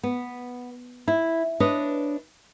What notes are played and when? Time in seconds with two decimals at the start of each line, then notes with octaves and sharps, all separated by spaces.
0.03 B3
1.08 E4
1.60 D4 B4 C#5 D#5